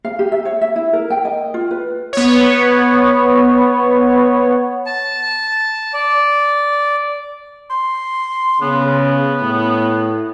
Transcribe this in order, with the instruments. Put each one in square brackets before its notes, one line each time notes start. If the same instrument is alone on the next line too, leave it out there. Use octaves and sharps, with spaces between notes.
[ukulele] F5
G4
E5
C#5
E5
E4
A#4
G5
D#5
F4
B4
[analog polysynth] B3 C#5
[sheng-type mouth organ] A5
D5
[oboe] C6
[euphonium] C#3 [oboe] B3
[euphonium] A2